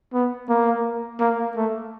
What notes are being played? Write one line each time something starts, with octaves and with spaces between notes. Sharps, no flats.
B3
A#3
A#3
A3